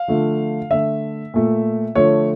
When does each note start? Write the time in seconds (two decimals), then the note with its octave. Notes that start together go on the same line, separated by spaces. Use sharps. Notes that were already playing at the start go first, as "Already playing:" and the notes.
Already playing: F5
0.08 D3 F3 A3
0.70 D3 A3 E5
1.34 A#2 A3
1.95 D3 F3 A3 C#5